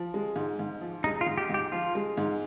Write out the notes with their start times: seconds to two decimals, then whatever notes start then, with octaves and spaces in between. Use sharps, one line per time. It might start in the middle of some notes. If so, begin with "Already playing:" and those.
Already playing: F3
0.14 G#3
0.36 G#2
0.59 G#2
0.81 F3
1.04 G#3 D#4
1.21 F4
1.27 G#2
1.38 G4
1.50 G#2 G4
1.72 F3 F4
1.95 G#3
2.17 G#2